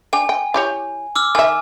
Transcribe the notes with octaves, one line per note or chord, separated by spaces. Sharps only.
D4 G5 G#5
G5
E4 G4 C#5
D6 E6 F6
D#3 E5 G#5